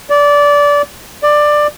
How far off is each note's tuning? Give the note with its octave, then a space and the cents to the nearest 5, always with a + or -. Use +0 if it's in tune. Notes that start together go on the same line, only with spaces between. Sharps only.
D5 -20
D5 +15